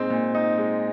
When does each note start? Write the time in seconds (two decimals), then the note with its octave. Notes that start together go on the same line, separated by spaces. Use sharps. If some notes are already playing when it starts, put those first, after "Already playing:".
Already playing: A#2 G#3 C4 D#4
0.10 A#2
0.35 D#4
0.58 G#3